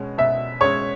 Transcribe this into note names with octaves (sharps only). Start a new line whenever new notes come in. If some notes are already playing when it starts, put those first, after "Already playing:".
Already playing: B2 G#3 C#4
B2 E5
G#3 C#4 C#5